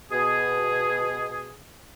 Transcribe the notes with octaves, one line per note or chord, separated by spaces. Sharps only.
B2 G#4